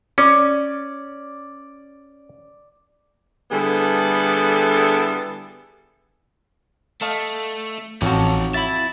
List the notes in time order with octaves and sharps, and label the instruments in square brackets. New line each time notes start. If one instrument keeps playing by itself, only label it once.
[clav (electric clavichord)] C#4 [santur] D5
[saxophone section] D3 G3 B3 E4 G#4 A4
[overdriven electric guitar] A3 [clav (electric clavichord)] D#5 F5 A5
[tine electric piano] A1 A5 [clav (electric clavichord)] F2 F#4 [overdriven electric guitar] D#4 C#5
[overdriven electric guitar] E5 B5 [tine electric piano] A6